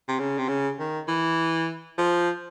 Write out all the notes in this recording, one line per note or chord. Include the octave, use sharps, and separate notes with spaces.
C3
C#3
C3
C#3
D#3
E3
F3